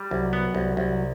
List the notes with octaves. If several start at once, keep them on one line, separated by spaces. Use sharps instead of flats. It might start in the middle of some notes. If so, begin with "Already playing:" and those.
Already playing: G3
C2 F#3
B3
C2
C2